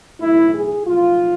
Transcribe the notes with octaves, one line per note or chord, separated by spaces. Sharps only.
B1 A2 E3 E4
G#4
B1 A2 F3 F4